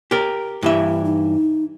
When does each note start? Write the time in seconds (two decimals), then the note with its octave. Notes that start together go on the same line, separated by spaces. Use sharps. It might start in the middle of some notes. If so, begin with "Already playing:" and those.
0.11 G4 A#4
0.63 G2 E3 E4 E5
1.05 D#4